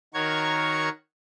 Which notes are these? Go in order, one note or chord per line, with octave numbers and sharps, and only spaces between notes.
D#3 F#4 A#4 C#5 C#6 G#6